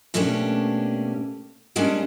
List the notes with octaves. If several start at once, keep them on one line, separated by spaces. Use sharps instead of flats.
B2 A3 A#3 C#4 D4 G4
G3 G#3 A#3 C#4 D4